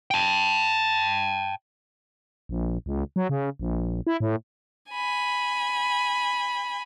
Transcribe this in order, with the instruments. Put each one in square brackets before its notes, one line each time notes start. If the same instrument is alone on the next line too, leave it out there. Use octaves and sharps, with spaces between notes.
[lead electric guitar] G5 A5
[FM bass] A#1
C#2
F#3
C#3
A#1
E4
A2
[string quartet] G#5 B5